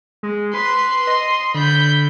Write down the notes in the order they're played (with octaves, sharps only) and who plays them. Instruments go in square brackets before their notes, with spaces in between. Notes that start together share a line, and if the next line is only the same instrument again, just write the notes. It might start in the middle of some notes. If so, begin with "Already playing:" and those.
[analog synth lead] G#3
[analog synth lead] B4 [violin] C6
[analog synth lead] D#5
[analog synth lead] D3 [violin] B5 G6